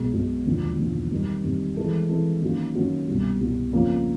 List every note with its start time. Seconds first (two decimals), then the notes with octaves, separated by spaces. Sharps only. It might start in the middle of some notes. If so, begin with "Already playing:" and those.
Already playing: B1 B2 G#3
0.13 B1 B2 G#3
0.45 E1 D#2 D3 F3
0.78 E1 D#2 D3 F3
1.11 C3 D#3 G3 C4
1.44 C3 D#3 G3 C4
1.77 E3 G#3 C4 E4 A4
2.09 E3 G#3 C4 E4 A4
2.42 D#3 F#3 A#3 C#4 F#4
2.75 D#3 F#3 A#3 C#4 F#4
3.08 C2 B2 G3
3.40 C2 B2 G3
3.73 F2 C#3 F3 A#3 C#4